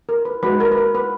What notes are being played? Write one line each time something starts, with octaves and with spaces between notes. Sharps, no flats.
A#4
B4
G#3 D#4 F#4 B4
A#4
B4
A#4
B4